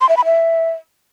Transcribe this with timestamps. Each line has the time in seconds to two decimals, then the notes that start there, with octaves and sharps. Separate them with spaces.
0.01 C6
0.09 E5
0.17 B5
0.25 E5